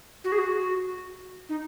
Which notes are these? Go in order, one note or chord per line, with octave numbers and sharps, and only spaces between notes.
F#4
G#4
F#4
D#4